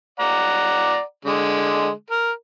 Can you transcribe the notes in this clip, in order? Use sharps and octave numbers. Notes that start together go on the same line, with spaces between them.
D5 F#5 A#5
D3 G#3
A#4